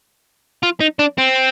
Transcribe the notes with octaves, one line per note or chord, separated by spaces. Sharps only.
F4
D#4
D4
C4